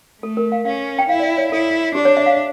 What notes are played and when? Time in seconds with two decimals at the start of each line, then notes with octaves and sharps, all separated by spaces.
0.22 A3 A4
0.37 A#4
0.52 F5
0.65 C#4 F5
0.99 G5
1.09 E4 F5
1.20 D5
1.23 E5
1.37 C#5
1.52 E4 A4
1.95 D4 G4
2.05 C#5
2.17 E5
2.26 F5